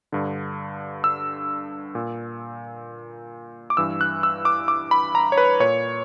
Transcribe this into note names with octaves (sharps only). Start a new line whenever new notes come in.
G2 D3
E6
A#2
D6
G2 E3 E6
F#6
E6
D6
D6
B5
A#5
C#5
B4
A#2 C#5